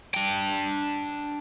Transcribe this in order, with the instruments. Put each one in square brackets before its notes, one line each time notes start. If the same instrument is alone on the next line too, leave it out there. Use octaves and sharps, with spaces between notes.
[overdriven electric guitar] D4 G5